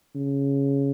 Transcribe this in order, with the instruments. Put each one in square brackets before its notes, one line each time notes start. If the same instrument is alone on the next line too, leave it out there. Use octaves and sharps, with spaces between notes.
[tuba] C#3